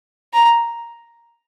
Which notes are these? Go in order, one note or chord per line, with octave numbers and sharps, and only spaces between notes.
A#5